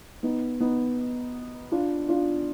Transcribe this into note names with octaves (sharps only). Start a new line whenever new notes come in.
B3 D#4
B3 D#4
D4 F4
D4 F4